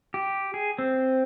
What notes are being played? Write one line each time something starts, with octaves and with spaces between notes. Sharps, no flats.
G4
G#4
C4